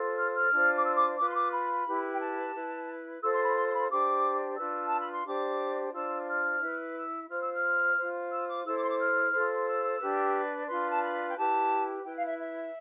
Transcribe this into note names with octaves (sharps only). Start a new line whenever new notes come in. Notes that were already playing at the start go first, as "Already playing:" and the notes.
Already playing: F4 A4 C5
F6
F6
D4 F4 C5
D6
E6
D6
F4 B4 D6
C6
D6
B5
E4 G4 B4
G5
A5
E4 B4
F4 A4 C5 E6
C6
B5
C6
C6
B5
D4 G4 C5 D6
D4 F4 B4 E6
A5
B5
C6
D4 G4 C5 D6
D4 F4 C5 E6
F6
E4 B4
E6
F4 C5 F6
E6
F6
F4 C5
E6
D6
E4 A4 C5 E6
D6
C6
D6
F6
F4 A4 C5
E6
D4 G4 B4
D4 F4 B4 C6
A5
B5
G5
E4 G4 B4 A5
E4 B4 G5
F5
E5
E5